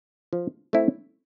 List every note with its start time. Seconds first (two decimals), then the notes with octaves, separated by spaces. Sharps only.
0.33 F3
0.73 A3 C4 E4